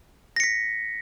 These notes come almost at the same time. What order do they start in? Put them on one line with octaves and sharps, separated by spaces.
A#6 C#7 B6